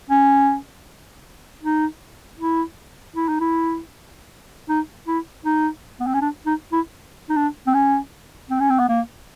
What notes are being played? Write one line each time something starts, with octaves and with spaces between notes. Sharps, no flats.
C#4
D#4
E4
E4
D#4
E4
D#4
E4
D#4
B3
C4
C#4
D4
D#4
E4
D#4
D4
C4
C#4
C4
C#4
C4
B3
A#3